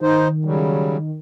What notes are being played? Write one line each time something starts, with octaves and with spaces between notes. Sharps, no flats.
D#3 D#4 C5
C#3 F#3 G3